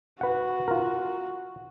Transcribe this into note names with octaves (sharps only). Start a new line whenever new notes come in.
F#4 B4 F#5
F4 A#4